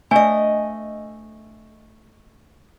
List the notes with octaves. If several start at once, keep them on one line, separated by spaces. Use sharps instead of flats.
A3 D4 C5 D#5 G#5